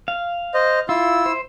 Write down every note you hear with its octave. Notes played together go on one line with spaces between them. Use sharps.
F5
C5 D#5
E4 F4 E6
C5